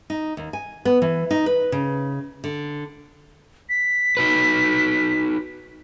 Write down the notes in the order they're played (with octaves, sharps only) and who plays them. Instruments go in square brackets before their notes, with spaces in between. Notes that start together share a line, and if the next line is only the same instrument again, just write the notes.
[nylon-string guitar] D#4
D#2
G#5
B3
E3
D#4
B4
C#3
D3
[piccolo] B6
[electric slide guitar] D#4 F#4 B4